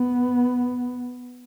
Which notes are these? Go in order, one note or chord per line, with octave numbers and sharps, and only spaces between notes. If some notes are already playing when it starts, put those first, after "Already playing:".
Already playing: B3